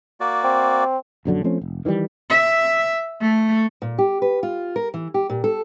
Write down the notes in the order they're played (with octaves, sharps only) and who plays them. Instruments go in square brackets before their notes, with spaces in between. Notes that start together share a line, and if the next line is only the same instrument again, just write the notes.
[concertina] A#3 F#4 D5
[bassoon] C4
[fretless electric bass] A#1 F#2 D3 F#3
F3 A3 C4 C#4
F1
D#3 E3 F#3 G3
[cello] E5
A3
[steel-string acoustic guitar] A#2
G4
B4
F4
A#4
E3
G4
A#2
A4